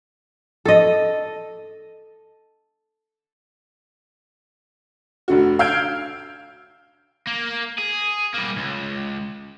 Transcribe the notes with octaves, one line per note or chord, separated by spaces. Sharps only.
A4 D#5
F1 D3 F#4
F5 E6 F6 G6 G#6 D7
A#3
G#4
G3 A#3
C#2